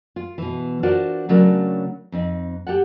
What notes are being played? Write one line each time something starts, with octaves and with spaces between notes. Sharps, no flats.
F4
B2 E3
D4 F4 F#4 A#4 C5 F#5
C#3 F#3 A3 D4 A#4
F2 C4 D#4
G4 A4 F#5